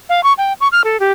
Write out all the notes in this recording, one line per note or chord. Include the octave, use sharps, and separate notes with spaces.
F5
C#6
G5
C#6
F6
A4
G4